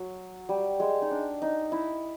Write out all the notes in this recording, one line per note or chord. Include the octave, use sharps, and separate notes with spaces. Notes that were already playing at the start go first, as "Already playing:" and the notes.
Already playing: F#3
G3
G#3
D#4
D4
D#4
E4